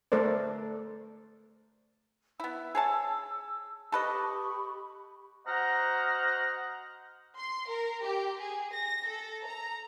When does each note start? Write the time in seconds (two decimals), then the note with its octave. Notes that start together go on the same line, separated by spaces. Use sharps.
0.12 A3 A4 A#4 C5 D5
2.40 B3 E4 E6
2.75 G#4 C#5 A5
3.92 G4 A4 B4 D#5 B5 C#6
5.47 F#4 C5 D#5 F#5 A#5 F6
7.38 C6
7.68 A#4
8.04 G4
8.40 G#4
8.73 A#6
9.07 A4
9.46 A#5